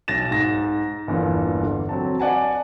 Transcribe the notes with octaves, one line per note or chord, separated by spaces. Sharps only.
B1 A6 A#6 E7
G#2 A#6
G1 E2 A#2
D3
F#3 C4 A5
D5 F#5 G#5 A5